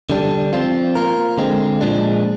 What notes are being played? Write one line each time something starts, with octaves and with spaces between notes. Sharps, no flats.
D3 G3 D4
F3 C4 F4
A#3 F4 A#4
D3 G#3 C4
A#2 F3 G#3 D4